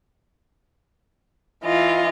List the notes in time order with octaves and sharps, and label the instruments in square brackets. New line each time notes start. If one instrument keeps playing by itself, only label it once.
[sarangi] E3 [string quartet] F4 D#5